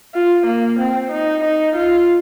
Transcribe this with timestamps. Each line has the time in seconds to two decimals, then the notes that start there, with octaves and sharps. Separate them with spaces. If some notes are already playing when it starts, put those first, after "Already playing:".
0.15 F4
0.47 A#3
0.80 C4
1.12 D#4
1.44 D#4
1.76 F4